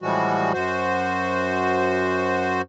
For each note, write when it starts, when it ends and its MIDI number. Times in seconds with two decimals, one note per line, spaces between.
0.02 0.53 45
0.02 0.53 52
0.02 0.53 53
0.02 0.53 55
0.02 0.53 56
0.02 0.53 66
0.53 2.62 42
0.53 2.62 66
0.53 2.62 72